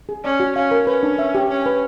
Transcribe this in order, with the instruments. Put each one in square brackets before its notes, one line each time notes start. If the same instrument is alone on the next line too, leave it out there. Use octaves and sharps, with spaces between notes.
[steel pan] G#4
[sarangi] C#4 [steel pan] D5
[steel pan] F#4
[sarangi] C#4 [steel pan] F5
[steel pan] A#4
[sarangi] C#4 [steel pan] B4
[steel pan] D4
E5
G4
[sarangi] C#4 [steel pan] G#5
[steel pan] B4